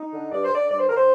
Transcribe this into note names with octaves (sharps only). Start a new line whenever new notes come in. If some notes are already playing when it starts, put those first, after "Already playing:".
Already playing: D#4
D3
G2 D5
C5
D3 D5
G2 D5
C5
D3 A#4
C5